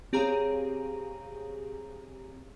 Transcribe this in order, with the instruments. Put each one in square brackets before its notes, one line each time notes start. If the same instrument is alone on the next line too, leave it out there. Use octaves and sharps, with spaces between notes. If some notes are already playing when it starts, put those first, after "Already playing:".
[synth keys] C4 G4 G#4 C#5 F5 A#5